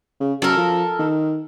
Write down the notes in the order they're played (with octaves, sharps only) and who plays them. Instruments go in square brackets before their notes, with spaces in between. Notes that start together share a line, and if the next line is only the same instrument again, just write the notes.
[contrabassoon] C#3
[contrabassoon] F#2 [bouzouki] A4 A#4
[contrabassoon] F3
D#3